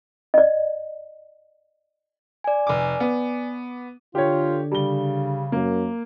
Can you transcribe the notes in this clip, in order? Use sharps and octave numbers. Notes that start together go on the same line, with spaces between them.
D5 D#5
D5 G#5
F1 D6
B3
D3 F4 G4 A4 C#5
C#3 G3 G7
F#2 A#3